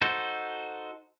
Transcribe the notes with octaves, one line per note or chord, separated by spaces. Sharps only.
D#4 F#4 A4 C5